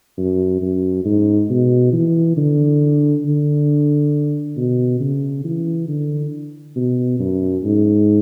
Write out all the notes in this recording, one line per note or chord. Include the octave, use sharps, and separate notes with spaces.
F#2
F#2
G#2
B2
E3
D3
D3
B2
C#3
E3
D3
B2
F#2
G#2